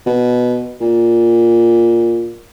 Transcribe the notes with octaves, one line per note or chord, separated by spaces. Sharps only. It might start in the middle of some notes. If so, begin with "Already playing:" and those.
B2
A#2